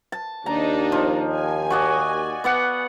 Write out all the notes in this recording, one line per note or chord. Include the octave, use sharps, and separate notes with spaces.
A5
D#2 D4 D#4 A#5
F3
G#5
F#4 D5 D#5
B3 D5 F#5